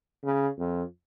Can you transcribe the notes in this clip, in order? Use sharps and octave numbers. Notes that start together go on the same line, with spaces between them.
C#3
F2